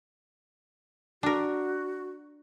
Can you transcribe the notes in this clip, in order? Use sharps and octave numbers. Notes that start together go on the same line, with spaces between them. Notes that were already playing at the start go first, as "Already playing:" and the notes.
D4 F#4 A#4